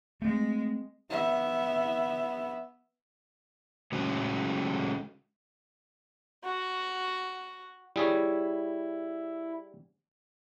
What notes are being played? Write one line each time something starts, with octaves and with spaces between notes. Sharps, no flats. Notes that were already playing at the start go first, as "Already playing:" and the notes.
G#3 A3 C4
B3 E5
C#3 F#3 G#3 A3 C#4 F#4
F#4
G3 E4 G#4 C#5